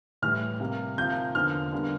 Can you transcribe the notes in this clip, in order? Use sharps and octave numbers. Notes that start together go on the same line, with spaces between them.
A2 E3 G3 F6
C3 G3 A#3
C3 F3 A#3 G6
E2 D3 F3 A#3 F6
E2 D3 G3 A#3